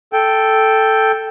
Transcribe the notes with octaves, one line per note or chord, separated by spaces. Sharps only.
A4 G5